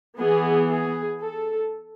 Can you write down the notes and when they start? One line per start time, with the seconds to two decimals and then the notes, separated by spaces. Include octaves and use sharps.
0.17 E3 B3 G#4
0.69 G#4
1.21 A4